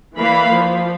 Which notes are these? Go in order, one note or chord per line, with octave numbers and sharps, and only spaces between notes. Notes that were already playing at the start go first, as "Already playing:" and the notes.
E3 A#3 D5 F5 B5
F3